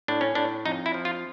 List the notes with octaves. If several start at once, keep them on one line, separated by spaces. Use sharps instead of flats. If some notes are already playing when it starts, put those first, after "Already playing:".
A2 D4
C#4
A2 D4
F2 D#4
E4
F3
F4